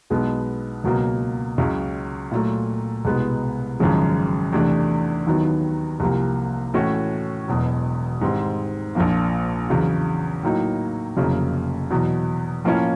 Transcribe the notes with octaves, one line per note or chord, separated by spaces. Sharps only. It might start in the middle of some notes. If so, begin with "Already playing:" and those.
B1 B2 G#3 B3
C#2 B2 F#3 A#3
C#2 C#3 F#3
A#2 F#3 A3
C2 B2 G#3 B3
G#1 F#2 C#3 F3 G#3
E2 C3 E3 A3 D4
D#2 D#3 F#3 B3
C2 C3 F3 A#3
A2 E3 A3 C#4 F#4
E1 E2 B2 F#3
G#2 D#3 G3 C4
A#1 A#2 F3 A#3
E2 C#3 F#3
A2 F#3 A#3 D#4
F1 F2 C#3 F#3 A#3
E2 B2 F#3
A2 F3 A#3 C#4 F4